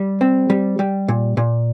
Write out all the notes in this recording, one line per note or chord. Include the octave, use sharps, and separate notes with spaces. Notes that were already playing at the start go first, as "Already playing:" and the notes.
Already playing: G3
C4
G3
G3
A#2
A#2